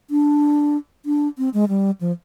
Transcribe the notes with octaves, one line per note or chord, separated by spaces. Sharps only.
D4
D4
C4
G#3
G3
F3